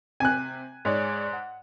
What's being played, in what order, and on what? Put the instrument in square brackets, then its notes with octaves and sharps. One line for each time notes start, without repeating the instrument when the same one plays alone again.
[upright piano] C3 [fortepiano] G#5 F#6
[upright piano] G#2 [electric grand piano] G#3 C#5 D5
[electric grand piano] F#5